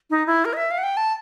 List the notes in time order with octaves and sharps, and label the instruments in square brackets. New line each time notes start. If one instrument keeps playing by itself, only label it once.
[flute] D#4
E4
A#4
D#5
E5
F5
F#5
G5
A5